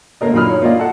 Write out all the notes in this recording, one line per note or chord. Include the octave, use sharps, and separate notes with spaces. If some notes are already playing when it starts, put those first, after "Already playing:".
A3 A#3 A#4 D#5
A#2 F#3 D#4 B5 D#6 F6
C#5
A#3 F4 D5 D#5 F5
F#4 A4 F#5